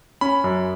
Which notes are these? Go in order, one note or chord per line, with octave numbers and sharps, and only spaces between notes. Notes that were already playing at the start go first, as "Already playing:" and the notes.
C#4 B5
F#2